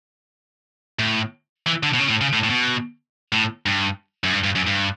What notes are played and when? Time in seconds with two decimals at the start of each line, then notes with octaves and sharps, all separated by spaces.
0.99 A2
1.66 E3
1.83 D3
1.94 B2
1.99 C#3
2.10 A2
2.21 C#3
2.33 A2
2.44 A2
2.50 B2
3.32 A2
3.66 G2
4.24 F#2
4.33 G2
4.44 G2
4.55 F#2
4.67 G2